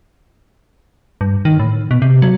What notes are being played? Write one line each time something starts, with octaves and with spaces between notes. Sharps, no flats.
G2
D#3
A2
B2
C3
F#3